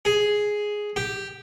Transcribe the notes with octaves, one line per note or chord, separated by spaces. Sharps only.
G#4
G4